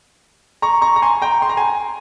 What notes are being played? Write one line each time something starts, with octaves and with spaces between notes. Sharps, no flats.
A#5 C#6
A#5 C#6
A#5
G#5 C6
G5 A#5
C6
A#5
G#5 C6